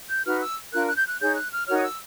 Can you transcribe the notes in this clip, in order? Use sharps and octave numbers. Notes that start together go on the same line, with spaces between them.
G6
D#4 F#4 B4 F6
E6
D4 F4 A#4 F#6
F#6
G6
F#6
D#4 G#4 C#5 G6
F#6
F6
D#4 F#4 A#4 C#5 F6
D#6
E6